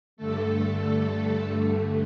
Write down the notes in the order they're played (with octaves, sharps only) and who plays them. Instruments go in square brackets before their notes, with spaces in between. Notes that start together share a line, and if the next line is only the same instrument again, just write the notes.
[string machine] G2 D3 A3 A4